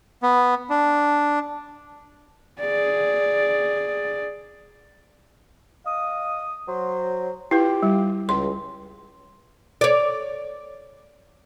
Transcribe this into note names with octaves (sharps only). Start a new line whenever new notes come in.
B3
D4
G#4 D5
D#5 F5 D#6
F#3 C5
E4 F4 G4 B4
G3
C#2 C6
C#5 D5